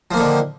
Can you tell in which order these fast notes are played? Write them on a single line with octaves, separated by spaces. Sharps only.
F3 A#3 D#3 D3